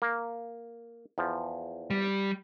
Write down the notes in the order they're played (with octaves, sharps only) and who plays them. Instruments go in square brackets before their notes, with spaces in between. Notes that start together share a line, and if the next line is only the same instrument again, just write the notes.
[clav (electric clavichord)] A#3
E2 F3
[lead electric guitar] G3